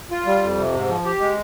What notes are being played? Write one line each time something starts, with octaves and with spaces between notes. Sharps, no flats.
F4
G3
F2
C3
G#2
F3
G4
G#3